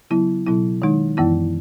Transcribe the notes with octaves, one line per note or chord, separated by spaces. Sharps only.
C#3 F#3 B3 E4
B2 F#3 B3 E4
D#3 G#3 D#4
F#2 E3 B3 E4